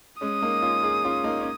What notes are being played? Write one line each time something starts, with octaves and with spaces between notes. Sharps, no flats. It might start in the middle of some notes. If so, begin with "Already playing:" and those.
G#3 C#4 D#6
A#3 D#4
C#4 F4
D#4 G#4
C#4 F4
A#3 D#4
C#4